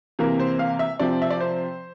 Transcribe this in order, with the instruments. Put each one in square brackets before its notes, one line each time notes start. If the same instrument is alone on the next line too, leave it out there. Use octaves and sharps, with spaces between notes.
[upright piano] C3 E3 A#3 A#4
C5
F5
E5
C3 F3 C4 D5
E5
D5
C5